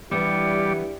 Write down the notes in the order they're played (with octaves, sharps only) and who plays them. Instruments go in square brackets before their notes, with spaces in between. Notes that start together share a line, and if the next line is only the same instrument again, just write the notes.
[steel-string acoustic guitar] E3 B3 [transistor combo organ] G3 D5 [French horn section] D4 E4 G4 [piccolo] C#7